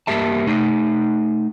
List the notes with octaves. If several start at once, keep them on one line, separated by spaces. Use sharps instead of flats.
G2 A#3 G4 E5 A5
A3 D#4